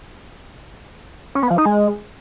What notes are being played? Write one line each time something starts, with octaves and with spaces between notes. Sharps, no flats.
C#4
B3
F3
D#4
G#3